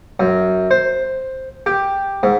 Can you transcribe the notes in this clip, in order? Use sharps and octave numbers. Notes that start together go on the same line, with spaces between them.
F#2
C5
G4
G#2